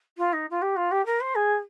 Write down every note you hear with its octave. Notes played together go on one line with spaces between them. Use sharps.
F4
D#4
F4
G4
F4
G4
A#4
C5
G#4